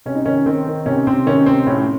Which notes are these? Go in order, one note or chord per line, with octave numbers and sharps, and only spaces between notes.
C3 C#4
D#4
D#3 C#4
D#3 C4
D#3
C3 C#4
C3 C4
D#3 C#4
C3 C4
A2 C#4